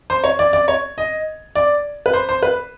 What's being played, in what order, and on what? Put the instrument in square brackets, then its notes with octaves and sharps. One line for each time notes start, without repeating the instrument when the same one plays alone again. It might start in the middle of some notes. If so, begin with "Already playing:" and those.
[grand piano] C5
C#5
D5
D5
C#5
D#5
D5
B4
C5
C5
B4